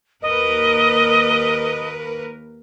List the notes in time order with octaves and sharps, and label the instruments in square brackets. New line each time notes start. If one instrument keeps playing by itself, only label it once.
[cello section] D#2 A#4 B4 [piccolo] D#5